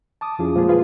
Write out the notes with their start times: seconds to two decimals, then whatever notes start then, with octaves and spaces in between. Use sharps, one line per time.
0.21 A5 D6 D#6
0.39 F2 F3 C#4 E4 F4 G#4
0.55 A#2 F3 G#3 A#3 F4 G#4
0.69 F4 G#4 B4 F5